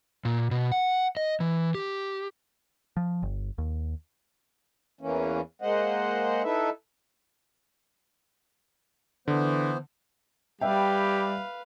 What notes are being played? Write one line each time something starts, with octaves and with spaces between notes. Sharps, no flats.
A#2
B2
F#5
D#5
E3
G4
F3
G1
D#2
E2 E3 A#3 C#4
G#3 A#3 C5 D#5 F#5
D#4 E4 A4 B4 E5
D3 E3 B3 C5
G3 G4 B4 E5 F5 G5